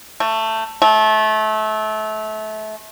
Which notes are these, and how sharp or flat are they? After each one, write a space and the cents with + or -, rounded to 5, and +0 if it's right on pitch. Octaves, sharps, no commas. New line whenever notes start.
A3 +15
A3 -25